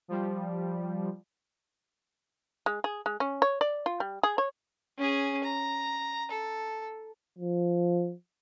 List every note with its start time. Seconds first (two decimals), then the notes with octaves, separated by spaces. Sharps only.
0.08 F3 G3
2.66 G#3
2.84 G#4
3.06 G#3
3.20 C#4
3.42 C#5
3.61 D5
3.86 F4
4.00 G3
4.23 G#4
4.38 C#5
4.98 C#4 G#4
5.44 A#5
6.31 A4
7.39 F3